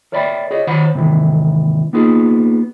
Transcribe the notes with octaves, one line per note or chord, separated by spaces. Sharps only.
A#4 C#5 D5 E5 G5 B5
G#4 C#5 D#5
D#3 C5 C#5 F#5 B5
G#2 C3 D#3 E3
A#3 B3 D#4 F4 G#4